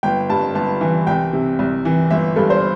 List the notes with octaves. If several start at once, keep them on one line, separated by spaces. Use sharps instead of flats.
G1 G5
G2 A5
G1 A5
E3
C2 G5
C3
C2
E3
G1 E5
G2 A4
C5